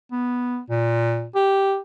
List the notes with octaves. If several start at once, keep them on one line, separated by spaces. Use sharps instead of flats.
B3
A#2
G4